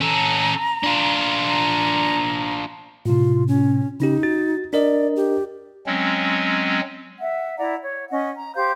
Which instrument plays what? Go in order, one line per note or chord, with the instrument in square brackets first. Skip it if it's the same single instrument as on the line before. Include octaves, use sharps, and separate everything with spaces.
[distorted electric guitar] C#4 A4 [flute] A#5
[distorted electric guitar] D4 F4
[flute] A#5
[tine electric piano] A2 C3 [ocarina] F4
[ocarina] C#4
[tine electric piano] C#3 C#4 G4 [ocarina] D#4
[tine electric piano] F#4 A6
[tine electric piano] D4 A#4 D#5 [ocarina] D5
[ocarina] G4
[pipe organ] F#3 G#3 C4 C#4
[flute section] E5 F#5
E4 D5 F#5 A#5
C#5
C#4 D#5 F#5
A#5
G4 C5 F5 G6